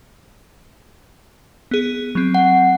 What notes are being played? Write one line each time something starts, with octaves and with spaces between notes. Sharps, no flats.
B3 G#4
F#3 C4
F#5